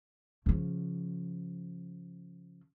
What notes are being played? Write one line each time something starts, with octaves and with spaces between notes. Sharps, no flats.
C#3 F3